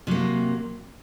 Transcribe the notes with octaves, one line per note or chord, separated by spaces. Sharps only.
C3 F#3 A#3